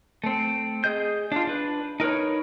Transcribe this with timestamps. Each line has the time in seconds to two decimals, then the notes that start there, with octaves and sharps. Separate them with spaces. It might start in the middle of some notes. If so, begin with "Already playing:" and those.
0.24 A3 C4
0.84 G#4 D#5 G6
1.32 D4 F4
1.47 D4 B4
2.00 D#4 A#4 B4 C#5